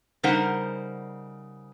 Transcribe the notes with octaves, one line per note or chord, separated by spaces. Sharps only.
C#3 G3 D#4 A#4 C5 F#5